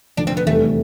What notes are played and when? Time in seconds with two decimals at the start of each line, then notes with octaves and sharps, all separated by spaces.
0.17 F1 F2 D3 D4
0.27 C4
0.37 B3
0.46 F1 E2 C3 G3 A3